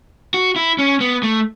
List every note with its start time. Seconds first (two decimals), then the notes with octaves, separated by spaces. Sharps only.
0.34 F#4
0.56 E4
0.79 C#4
1.00 B3
1.23 A3